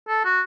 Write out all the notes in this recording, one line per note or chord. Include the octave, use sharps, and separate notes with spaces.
A4
F#4